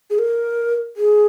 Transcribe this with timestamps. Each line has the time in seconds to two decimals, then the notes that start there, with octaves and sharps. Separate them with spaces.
0.10 G#4
0.19 A#4
0.97 G#4